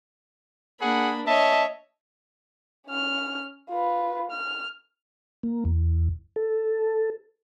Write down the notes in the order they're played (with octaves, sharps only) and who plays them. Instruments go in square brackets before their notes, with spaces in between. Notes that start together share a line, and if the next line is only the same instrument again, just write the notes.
[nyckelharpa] A#3 [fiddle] D4 B5 [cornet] G#4 [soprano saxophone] F#5
[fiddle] C#5 [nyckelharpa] D#5 [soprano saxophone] E5 [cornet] A5
[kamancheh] C#4 F6
F4 B4
F6
[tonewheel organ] A#3
E2
A4